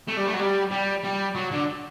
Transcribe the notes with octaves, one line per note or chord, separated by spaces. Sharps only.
A3
G3
A3
F#3
G3
G3
G3
F#3
D3